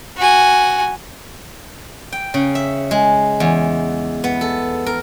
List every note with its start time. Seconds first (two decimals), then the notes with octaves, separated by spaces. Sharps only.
0.17 F#4 G#5
2.12 G5
2.34 C#3
2.55 E5
2.91 G#3
3.40 E2
4.24 B3
4.41 A4
4.86 A#4